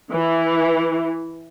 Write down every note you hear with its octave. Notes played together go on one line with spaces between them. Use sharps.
E3